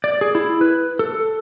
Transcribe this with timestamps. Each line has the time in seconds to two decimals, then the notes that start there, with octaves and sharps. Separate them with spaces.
0.04 D5
0.21 G#4
0.35 E4
0.61 B4
0.99 A4